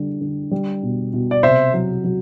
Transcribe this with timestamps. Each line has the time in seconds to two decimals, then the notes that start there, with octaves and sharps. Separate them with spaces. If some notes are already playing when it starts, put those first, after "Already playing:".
Already playing: D3 G3
0.21 D3
0.51 G3
0.83 B2
1.13 B2
1.31 D5
1.43 C3 C5 E5
1.74 F#3
2.04 F#3